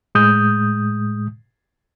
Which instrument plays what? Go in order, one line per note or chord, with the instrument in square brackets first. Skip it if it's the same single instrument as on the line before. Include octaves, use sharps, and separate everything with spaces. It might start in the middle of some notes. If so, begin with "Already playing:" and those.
[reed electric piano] A2 G#3 D#6 G6